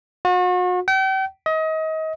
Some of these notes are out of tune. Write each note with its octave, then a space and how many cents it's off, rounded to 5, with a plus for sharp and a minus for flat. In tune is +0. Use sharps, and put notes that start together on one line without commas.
F#4 -40
G5 -40
D#5 +30